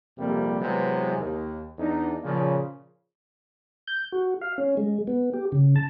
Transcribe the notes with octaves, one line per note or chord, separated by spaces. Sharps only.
A#1 F2 C3 G3 A#3
C3 E3 F#3 G#3 B3 C4
D#2
E2 D4 D#4
A#2 C#3 F3
G6
F#4
F5
C#4
G#3
B3
G4
C#3
A5